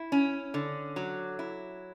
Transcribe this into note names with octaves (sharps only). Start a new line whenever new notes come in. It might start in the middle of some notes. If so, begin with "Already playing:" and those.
Already playing: E4
C#4
D3
F#3
E4